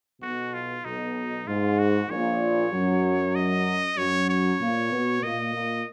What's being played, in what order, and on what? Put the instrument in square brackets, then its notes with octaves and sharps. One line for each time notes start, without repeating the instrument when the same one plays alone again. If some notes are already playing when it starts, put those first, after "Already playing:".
[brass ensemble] B1 B2 [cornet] F#4
[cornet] F4
[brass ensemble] B1 B2 [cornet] D#4
[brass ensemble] G#2 [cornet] F4
[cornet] F#4
[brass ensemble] A#1 A#2 [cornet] C#5
[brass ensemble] F#2 F#3
[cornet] D#5
[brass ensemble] F#2 F#3 [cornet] C#5
[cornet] C#5
[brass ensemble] A#2 A#3
B2 B3
[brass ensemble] A#2 A#3 [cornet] D#5
[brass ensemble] A#2 A#3